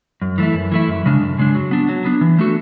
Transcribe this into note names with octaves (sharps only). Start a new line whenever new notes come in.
F#2
E3 A3 E4
F#2
E3 A3 E4
F#2
C#3 G#3 D4
F#2
C#3 G#3 D4
F#3
B3 D4
F#3
B3 D4
E3
A3 D4 F#4 A4